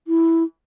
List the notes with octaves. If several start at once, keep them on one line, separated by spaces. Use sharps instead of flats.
E4